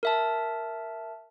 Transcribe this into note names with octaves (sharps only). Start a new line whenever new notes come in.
A#4 E5 A5